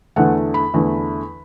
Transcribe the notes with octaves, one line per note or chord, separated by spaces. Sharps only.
E2 D3 A3 F#5
B5
E2 D3 A3